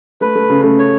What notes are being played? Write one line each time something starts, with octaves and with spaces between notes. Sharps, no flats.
A3 B4
A3
C#3
A3
C#5